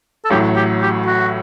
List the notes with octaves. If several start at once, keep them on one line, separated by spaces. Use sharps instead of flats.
A4
A1 A2 F#3 G4
G4
G4
F#4